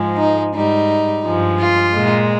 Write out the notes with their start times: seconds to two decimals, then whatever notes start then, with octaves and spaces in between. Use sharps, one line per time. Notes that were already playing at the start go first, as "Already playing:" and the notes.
Already playing: G#2 F3 G#3
0.17 D#4
0.53 G#2 G3 D#4
1.24 G2 F3 G#3
1.59 F4
1.95 A#2 G#3